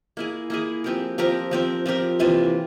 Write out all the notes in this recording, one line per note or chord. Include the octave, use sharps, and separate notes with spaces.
A#3 E4 G#4
A#3 E4 G#4
F3 C4 G4 A#4
F3 C4 G4 A#4
F3 C4 G4 A#4
F3 C4 G4 A#4
C3 E3 A#3 F4